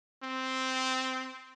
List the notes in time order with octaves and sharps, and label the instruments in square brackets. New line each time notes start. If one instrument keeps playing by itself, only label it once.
[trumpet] C4